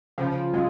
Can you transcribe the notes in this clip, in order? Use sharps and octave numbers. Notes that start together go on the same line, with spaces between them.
C#3 F3
F#3 G#3 C#4 F4